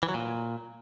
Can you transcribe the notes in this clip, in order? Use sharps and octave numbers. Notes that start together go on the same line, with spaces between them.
E3
F#3
A#2